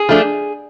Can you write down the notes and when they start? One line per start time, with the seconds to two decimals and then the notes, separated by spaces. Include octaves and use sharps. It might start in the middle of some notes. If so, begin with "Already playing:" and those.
Already playing: G#4
0.09 F3 A3 D4